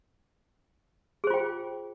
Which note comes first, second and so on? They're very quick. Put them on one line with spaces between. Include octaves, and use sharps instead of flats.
G#4 C5 F4 G5